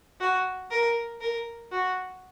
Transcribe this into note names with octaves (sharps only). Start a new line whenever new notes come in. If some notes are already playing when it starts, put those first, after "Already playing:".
F#4
A#4
A#4
F#4